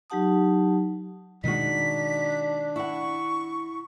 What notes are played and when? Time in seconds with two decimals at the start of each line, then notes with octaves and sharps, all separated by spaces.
0.10 F#3 D#4 G4 F#5 A5 D#6
1.44 B2 D#3 G#3 D4 D#4 F#4 B6
2.76 E4 F#5 C#6